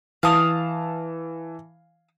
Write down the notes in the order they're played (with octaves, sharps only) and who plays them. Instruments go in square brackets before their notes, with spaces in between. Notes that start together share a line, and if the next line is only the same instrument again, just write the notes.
[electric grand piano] E3 A5 [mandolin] F5 D#6